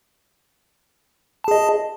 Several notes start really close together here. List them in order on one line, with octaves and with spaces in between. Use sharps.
A5 G#4 D#5